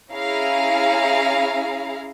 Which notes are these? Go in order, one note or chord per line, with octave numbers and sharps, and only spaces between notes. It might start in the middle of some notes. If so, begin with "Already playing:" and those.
C#4 E4 G#4 F5 A#5